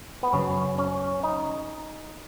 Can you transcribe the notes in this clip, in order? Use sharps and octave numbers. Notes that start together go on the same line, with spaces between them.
B3
F#2 C#3 F#3 C#4
C#4
D#4